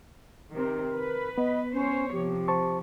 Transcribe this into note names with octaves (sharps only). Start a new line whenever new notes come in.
C3 D#3 C4 A#4
B4
B3 D#5
C#4 C5 C#5
C3 F3 G4
C5 A5 C#6